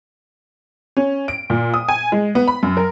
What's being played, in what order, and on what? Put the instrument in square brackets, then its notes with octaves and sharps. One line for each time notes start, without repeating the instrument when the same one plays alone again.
[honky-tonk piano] C#4
D7
A#2
D#6
G#5
G#3
B3
B5
F#2
A#4